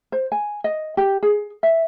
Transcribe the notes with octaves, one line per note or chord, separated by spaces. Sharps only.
C5
G#5
D#5
G4
G#4
E5